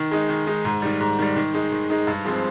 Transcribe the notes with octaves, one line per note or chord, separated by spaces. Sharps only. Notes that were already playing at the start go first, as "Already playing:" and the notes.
Already playing: D#3
G#3 D#4
D#3
G#3 D#4
G#2
D#3 G3
G#2
D#3 G3
D#3
G#3 D#4
D#3
G#3 D#4
G2
F3 G#3 C4